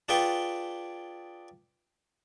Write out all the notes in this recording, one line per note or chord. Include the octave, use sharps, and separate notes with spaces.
D4 F4 G#4 B4 G5 C#6